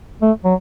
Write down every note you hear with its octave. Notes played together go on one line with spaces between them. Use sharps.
A3
F#3